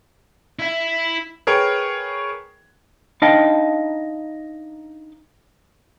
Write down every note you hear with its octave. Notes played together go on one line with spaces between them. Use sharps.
E4 E5
G#4 A#4 B4 C#5 G5
D4 D#4 D#5 F5 G5 A5